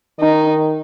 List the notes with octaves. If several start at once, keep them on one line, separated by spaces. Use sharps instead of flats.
D#3 D#4